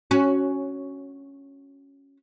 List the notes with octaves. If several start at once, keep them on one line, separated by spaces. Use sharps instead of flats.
C#4 F#4